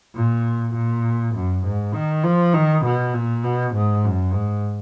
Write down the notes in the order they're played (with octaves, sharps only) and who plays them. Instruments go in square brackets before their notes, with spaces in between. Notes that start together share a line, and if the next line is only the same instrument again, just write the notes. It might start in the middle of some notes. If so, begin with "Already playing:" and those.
[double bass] A#2
A#2
F#2
G#2
D#3
F3
D#3
B2
A#2
B2
G#2
F#2
G#2